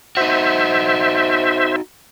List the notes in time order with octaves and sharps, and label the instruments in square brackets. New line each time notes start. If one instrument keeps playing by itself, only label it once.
[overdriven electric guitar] D#4 F#4 [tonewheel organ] C5 E5